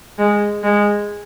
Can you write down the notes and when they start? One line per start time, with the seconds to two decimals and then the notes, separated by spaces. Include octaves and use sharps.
0.18 G#3
0.63 G#3